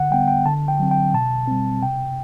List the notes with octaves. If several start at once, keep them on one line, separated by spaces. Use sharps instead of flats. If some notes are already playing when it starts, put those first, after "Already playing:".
Already playing: D3 F#5
G3 B3 G5
G5
D3 A5
G5
F#3 C4
G5
B2 A5
G3 C4
C3 G5